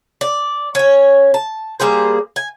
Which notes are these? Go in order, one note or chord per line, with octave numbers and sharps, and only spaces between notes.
D5
C#4 C#5
A5
G3 A#3 G#4 C5
G#5